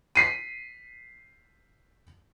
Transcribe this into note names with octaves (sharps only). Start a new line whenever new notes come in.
B6 C7 D#7